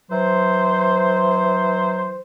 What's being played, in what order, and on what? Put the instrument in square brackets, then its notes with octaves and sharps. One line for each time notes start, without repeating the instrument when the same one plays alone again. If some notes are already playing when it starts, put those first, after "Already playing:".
[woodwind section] E3 F#3 C5